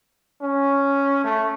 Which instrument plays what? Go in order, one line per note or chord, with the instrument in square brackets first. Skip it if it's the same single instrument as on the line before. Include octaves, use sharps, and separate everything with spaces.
[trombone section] C#4
A3